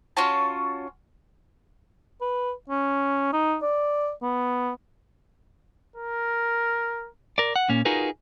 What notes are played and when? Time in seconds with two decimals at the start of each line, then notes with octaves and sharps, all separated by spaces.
0.17 C#4 F4 F#4 A5
2.21 B4
2.70 C#4
3.33 D#4
3.62 D5
4.22 B3
5.96 A#4
7.38 A#4 D5
7.56 F#5
7.69 A#2 A#3 C#4
7.85 D#4 F4 F#4 G#4 A#4 B4